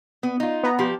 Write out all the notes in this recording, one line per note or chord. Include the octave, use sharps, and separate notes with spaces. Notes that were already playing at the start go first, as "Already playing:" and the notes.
B3
D#4 F4
B3 A#5
F3 G4